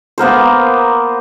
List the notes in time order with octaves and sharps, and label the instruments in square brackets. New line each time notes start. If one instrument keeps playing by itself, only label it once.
[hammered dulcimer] A#3 B3 A#4 C5